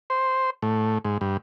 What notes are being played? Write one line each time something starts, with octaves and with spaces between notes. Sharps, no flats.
C5
A2
G#2
G2